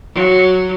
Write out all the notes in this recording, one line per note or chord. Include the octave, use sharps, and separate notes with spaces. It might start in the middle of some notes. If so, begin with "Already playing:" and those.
F#3